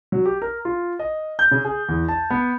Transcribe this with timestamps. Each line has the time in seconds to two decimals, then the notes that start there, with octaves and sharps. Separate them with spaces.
0.12 F#3
0.26 G4
0.42 A#4
0.65 F4
0.99 D#5
1.39 G6
1.51 C#3
1.65 G#4
1.89 E2
2.08 A5
2.30 B3